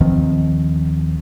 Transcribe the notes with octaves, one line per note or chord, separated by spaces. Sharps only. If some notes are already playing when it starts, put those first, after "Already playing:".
D#2 D#3 F3 C4